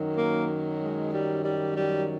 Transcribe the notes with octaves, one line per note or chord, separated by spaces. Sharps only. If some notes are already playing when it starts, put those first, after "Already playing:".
Already playing: F#2 D#3 F#3
A#3
G#3
G3
G3
G3